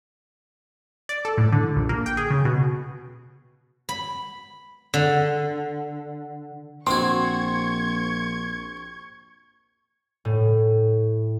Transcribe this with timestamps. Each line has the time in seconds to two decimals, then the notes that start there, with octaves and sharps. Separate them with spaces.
1.09 D5
1.25 A4
1.38 A2
1.52 D3
1.76 A#1
1.89 A#3
2.06 G5
2.17 G#4
2.30 C#3
2.45 B2
3.89 B5
4.94 D3
6.87 A#1 C4 F#4 C6 C#6 G#6
10.25 A2